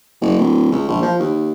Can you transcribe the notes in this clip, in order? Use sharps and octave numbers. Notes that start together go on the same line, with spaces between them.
F#1
D1
C#2
A#1
F3
D#2